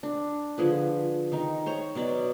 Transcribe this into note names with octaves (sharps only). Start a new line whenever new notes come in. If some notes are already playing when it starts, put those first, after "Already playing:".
D4
D3 F3 G#4 B4
D#3 D#4 A#4
C5 C#5 A#5
B2 F#3 D5 B5